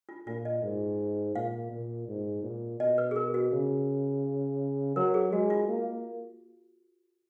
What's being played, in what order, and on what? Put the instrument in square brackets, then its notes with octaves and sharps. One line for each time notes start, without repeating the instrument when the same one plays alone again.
[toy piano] F4
[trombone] A#2 [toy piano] F4
[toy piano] D#5
[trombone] G#2
[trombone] A#2 [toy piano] F5
[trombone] A#2
G#2
A#2
[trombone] B2 [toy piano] D#5
[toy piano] B4
G#4
A#4
F#4
[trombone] C#3
[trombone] F#3 [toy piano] A#4
[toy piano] G#4
[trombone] G#3 [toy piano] F#4
[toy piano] F4
[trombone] A#3